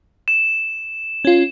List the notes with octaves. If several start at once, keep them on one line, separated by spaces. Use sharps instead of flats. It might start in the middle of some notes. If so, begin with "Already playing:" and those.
E7
C#4 F4